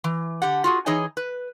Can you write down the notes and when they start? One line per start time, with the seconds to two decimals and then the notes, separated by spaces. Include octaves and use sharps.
0.04 E3
0.42 D3 G4 F#5
0.64 F4 F#4 G#4
0.86 E3 D#4 G#4 C#5 D#5 G#5
1.17 B4